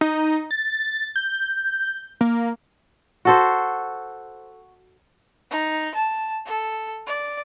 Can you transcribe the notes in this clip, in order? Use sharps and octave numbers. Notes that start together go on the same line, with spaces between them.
D#4
A6
G6
A#3
F#4 A4 C5
D#4
A5
A4
D5